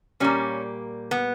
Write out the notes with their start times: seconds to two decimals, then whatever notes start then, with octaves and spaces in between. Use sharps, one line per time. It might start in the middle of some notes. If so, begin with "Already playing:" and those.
0.20 A#2 G3 A#3 C#4
1.11 B3